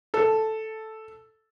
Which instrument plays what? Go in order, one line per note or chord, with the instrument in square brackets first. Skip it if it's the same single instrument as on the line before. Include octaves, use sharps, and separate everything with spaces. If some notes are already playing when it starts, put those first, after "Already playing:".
[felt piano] A4